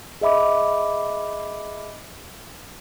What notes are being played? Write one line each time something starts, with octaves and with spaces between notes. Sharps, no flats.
G#4 D#5 E5 B5 D6